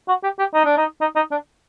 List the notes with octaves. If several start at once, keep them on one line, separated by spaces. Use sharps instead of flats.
F#4
G4
G4
D#4
D4
D#4
D#4
D#4
D4